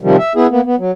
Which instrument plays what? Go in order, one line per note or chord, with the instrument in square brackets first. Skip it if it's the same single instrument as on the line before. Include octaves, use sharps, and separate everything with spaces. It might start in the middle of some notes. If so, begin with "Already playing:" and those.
[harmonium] C3 D#3 F3 G3
E5
B3 E4 G#4
A#3 B3
B3
F#3